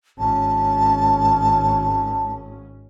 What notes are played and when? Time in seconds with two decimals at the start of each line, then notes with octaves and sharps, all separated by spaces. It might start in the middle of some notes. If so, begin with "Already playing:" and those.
0.19 G#1 C#4 A5